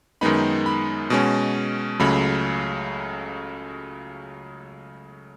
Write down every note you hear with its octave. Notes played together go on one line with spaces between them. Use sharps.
F#2 D#3 G#3 B3 D#4 B5
B5
B2 G#3 C#4
C#2 C#3 F#3 A3 B5